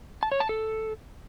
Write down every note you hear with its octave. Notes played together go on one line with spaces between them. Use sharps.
A5
C#5
A5
A4